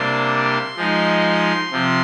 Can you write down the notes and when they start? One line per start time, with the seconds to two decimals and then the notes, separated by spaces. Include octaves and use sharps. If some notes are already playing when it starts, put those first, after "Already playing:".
Already playing: C3 G3 A#3 D4 C6
0.77 F3 G#3 D#4
1.72 C3 F3